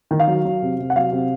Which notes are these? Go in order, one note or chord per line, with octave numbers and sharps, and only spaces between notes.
D#3
F5
F#3
F#3
C3
C3
F#5
F#3 F5
C3